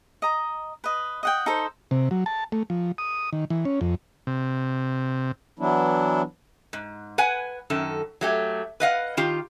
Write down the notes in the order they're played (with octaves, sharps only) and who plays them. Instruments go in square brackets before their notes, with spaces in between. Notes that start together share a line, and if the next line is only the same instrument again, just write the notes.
[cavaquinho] D#5 A#5
B4 D#5
D#5 F#5 G5
D#4 A4 C5
[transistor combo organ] C3
F#3
A5
A3
F3
D#6
D#3
E3
C#4
F2
C3
[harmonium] E3 F#3 B3 D4 E4
[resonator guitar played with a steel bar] G#2
B4 F#5 G#5
F#2 D#3 A4
F#3 A3 G4
B4 D#5 F5 F#5
D#3 F4 G4